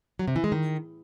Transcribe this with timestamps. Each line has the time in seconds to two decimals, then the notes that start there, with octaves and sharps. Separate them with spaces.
0.19 F#3
0.28 C3
0.36 E3
0.44 G#3
0.52 D#3